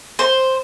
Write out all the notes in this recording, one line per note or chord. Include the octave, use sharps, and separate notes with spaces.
C5